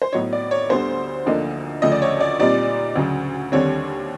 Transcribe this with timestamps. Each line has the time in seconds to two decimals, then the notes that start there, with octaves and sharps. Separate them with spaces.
0.02 C5
0.13 A2 F#3 B3 D#4 C#5
0.33 D5
0.51 C#5
0.69 D2 D3 G3 B3 C5
1.26 D2 D3 F3 A#3 D#4
1.82 D2 C#3 F3 A3 D#5
1.92 D5
2.02 C#5
2.20 D5
2.39 A#2 G3 C4 D#4 D5
2.95 D2 C#3 F#3
3.52 D#2 D3 G3 C4 C#5